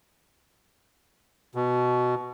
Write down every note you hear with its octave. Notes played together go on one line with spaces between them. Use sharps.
B2